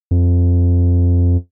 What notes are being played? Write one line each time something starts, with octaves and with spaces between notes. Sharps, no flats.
F2